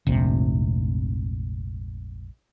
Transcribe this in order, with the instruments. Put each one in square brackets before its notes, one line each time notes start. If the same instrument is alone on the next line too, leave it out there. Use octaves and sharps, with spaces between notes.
[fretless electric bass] F1 A#1 G#2 C3